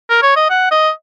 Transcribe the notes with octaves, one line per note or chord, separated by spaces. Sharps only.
A#4
C#5
D#5
F#5
D#5